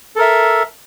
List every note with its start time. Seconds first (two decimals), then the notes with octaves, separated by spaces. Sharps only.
0.16 A4
0.19 A#4
0.21 E5